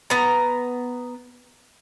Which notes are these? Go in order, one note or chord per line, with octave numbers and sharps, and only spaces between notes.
B3 A#5